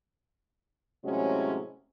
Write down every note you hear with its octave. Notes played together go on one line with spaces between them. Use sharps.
A2 C3 F#3 G#3 C#4 F#4